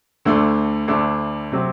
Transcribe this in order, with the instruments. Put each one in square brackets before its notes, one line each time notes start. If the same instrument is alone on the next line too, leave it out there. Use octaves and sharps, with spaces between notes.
[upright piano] D2 D3 A3 D4
D2 D3 A3 D4
C3 F#3 C4